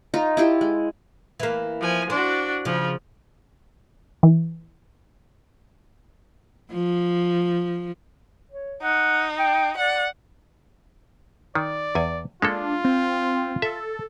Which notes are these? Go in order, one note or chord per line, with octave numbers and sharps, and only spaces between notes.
D#4 F4
E4 F4 G4
G#3
E3 A#3
F3 G#5
D4 F#4 C5
C#3 F3
E3
F3
C#5
D#4 F#5
G5
D5 F#5
D#3 D5
E2 G#5
G#3 A#3 D4 F4 A4
C4
A4 E5